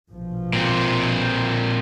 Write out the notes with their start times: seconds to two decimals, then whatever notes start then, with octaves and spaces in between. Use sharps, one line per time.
0.11 A#1 B2 F3
0.53 A#2 C4